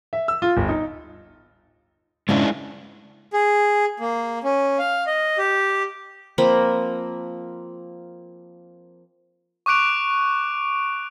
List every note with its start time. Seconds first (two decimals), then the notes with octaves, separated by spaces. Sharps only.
0.13 E5
0.28 E6
0.42 F4
0.57 G1
0.69 D#4
2.29 G#2 C#3 G#3 D4 E4
3.33 G#4
4.00 A#3
4.44 C#4
4.79 F5
5.07 D#5
5.38 G4
6.38 F3 A#3 C4 B5
9.66 C#6 D6 F#6 D7 F7